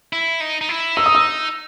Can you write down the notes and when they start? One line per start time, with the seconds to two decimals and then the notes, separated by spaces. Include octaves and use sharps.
0.13 E4
0.41 D#4
0.61 D#4
0.69 E4
0.96 D#4 E6
1.06 D#6
1.15 E6